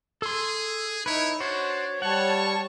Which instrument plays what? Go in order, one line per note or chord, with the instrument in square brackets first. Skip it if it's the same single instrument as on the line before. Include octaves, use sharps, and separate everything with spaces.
[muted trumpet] G#4 [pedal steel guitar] A4 C6
[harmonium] D#4 [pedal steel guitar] E4 B4 [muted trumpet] C#5
[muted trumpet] D4 [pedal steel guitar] F#4 C5 [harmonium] C#5
[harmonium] G3 [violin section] C#5 A5 [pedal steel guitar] F#5 [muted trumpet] C#6